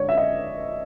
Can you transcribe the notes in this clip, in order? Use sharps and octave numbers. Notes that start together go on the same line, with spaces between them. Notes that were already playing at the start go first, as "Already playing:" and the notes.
Already playing: D3 G#3 C#5 D5
E5
D#5